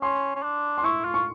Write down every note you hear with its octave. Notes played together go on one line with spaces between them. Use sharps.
C#4 C6
C#4
D4
C6
E4 C#6
F4
C#6